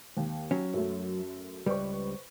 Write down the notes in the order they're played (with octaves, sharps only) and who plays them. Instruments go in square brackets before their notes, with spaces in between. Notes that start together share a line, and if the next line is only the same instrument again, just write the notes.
[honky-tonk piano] D#2
[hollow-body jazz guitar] F#3 C#4
[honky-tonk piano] F#2 A3
[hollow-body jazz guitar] C#2 G3 [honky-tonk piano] B4 C5 C#6